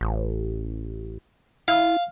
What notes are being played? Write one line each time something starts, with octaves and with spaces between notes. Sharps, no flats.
A1
E4 F5